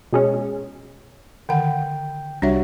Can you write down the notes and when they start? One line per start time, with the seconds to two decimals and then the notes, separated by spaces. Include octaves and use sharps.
0.13 B2 G#3 C#4
1.49 D3 D#3 F#5 G5
2.42 C2 G3 D4 F#4 C#5 E5